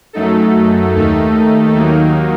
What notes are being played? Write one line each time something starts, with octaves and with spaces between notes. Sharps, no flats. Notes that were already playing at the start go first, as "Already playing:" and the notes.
F#2 F#3 A3 D#4 A4
D#2 D#3 A3 D#4 A4
D#2 D#3 F#3 A#3 D#4